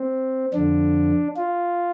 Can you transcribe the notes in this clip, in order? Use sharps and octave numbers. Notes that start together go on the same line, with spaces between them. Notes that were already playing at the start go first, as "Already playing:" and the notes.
Already playing: C4
F2 D3 D4
F4